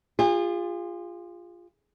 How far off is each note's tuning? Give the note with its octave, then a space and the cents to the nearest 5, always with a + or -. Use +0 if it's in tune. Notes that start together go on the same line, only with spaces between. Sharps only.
F4 +0 G#4 -40